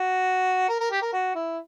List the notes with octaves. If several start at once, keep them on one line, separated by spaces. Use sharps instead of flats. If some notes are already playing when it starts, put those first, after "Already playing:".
Already playing: F#4
A#4
A#4
G4
A#4
F#4
E4